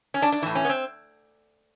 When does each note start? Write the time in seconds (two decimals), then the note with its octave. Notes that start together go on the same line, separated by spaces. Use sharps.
0.14 C#4
0.22 D4
0.32 D4
0.42 A2 E3
0.55 C#4
0.65 B3
0.69 C4